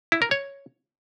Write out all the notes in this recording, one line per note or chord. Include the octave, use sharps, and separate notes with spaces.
E4
A#4
C#5